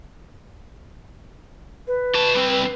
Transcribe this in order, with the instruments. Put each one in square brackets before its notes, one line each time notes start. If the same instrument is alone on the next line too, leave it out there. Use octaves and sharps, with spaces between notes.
[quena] B4
[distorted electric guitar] F#4 A5
G3 C4